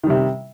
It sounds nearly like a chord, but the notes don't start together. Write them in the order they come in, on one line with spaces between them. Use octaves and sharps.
D#3 G3 C3